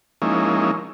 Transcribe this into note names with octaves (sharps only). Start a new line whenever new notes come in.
F3 G#3 A#3 C#4 D#4 E4